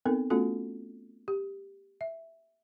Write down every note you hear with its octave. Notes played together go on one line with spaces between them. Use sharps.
B3 C4 D#4 A4 A#4
A3 B3 C#4 F4 F#4 A4
G4
E5